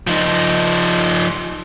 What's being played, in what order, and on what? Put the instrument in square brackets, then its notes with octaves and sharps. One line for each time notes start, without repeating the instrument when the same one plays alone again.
[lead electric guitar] F3 D#4